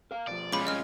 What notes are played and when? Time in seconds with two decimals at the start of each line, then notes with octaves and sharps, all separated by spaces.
0.11 A#4 F5
0.27 B2 F3 D5
0.53 B1 G3 G#3 C#4 F4 B5 D6
0.67 C2 C#3 D#5 F6